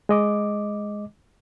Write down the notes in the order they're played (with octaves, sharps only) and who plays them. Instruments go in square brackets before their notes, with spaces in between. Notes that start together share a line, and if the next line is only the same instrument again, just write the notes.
[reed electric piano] G#3 D#5 D6